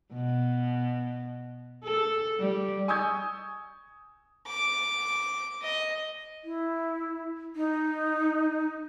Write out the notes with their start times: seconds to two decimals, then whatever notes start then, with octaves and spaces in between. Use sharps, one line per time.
0.13 B2
1.84 A4
2.40 G3
2.88 G#5 C#6 D#6 E6 G6 G#6
4.47 D6
5.63 D#5
6.44 E4
7.56 D#4